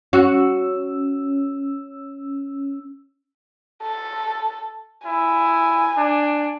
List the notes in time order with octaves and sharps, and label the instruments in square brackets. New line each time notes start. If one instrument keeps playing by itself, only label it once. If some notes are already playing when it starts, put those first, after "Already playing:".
[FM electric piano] C#4 E6 [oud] F#4
[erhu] A4
[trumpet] E4 [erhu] G#5
[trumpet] D4